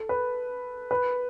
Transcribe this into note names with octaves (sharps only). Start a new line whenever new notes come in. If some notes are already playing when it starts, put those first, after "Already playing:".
Already playing: A4
B4
B4